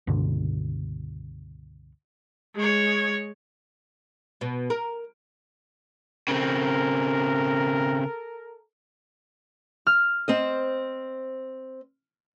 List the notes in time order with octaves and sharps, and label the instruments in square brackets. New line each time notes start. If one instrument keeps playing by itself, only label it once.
[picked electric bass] C#2 G2 B2 D3
[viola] G#3 C#5
[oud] B2
A#4
[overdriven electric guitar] C#3 C4 [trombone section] A4 A#4
[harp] F6
[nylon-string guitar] C4 C5 D#5